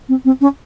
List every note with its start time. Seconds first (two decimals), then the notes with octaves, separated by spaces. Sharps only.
0.09 C4
0.25 C4
0.41 C#4